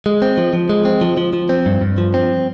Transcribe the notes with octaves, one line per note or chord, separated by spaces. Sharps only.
G#3
C4
F3
F3
G#3
C4
F3
F3
F3
C4
G2
G2
F3
C4